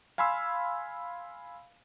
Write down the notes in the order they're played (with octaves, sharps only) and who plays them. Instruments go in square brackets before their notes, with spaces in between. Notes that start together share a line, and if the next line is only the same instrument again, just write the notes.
[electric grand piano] F5 G#5 B5 C6 E6